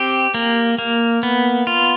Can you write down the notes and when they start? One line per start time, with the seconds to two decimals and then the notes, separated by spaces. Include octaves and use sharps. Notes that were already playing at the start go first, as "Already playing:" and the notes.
Already playing: C4 G4
0.34 A#3
0.79 A#3
1.23 B3
1.67 F4